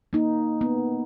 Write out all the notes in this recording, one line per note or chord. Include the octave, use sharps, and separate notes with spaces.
A#3 D#4
B3